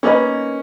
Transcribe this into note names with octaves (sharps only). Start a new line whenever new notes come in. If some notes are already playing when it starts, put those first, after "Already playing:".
A#3 C#4 D#4 G#4 B4 D#5